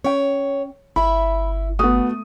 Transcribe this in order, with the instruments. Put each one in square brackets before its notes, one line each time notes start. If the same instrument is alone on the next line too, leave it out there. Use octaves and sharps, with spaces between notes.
[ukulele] C#4 G5 [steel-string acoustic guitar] C#5
[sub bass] G1 [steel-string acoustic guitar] E4 E5 [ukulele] B5
[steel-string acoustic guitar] A3 [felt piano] B3 D#6 [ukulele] F#4